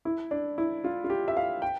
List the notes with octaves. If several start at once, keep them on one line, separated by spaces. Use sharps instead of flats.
E4
D4
E4
F4
F4
G4
E5
F5
G5